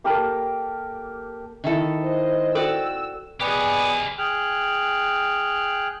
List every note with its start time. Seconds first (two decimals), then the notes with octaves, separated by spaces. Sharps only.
0.04 A#3 G4 A4 A#4
1.64 D#3 E4 A4
2.00 C5 D#5
2.55 F#4 A4 D5 G5 E6
3.40 B3 G4 G#4 D5 D#5 F#5 G#5
4.18 G#4 G5 F6 F#6